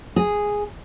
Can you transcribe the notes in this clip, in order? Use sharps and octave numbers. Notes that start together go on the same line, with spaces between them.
G#4